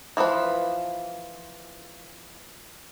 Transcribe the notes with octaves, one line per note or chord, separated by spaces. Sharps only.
E3 F3 F4 B4